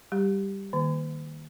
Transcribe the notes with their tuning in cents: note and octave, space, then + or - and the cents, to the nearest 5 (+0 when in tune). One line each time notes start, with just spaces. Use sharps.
G3 +0 G4 +0
D#3 -15 A#3 +0